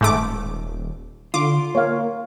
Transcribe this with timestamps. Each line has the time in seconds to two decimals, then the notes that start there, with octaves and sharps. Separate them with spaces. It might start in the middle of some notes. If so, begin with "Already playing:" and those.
0.01 D#1 G#2 A3 D6
1.34 D3 F4 D6
1.75 A#3 C#5 F5